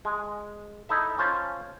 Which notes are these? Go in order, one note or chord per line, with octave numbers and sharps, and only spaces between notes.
G#3
D#4 E4 A4 E5
C#4 F4 C5 A5